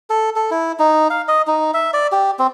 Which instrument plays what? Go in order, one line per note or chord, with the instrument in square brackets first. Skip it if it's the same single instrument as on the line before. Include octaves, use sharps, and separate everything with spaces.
[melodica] A4
A4
E4
D#4
F5
D#5
D#4
E5
D5
G4
C4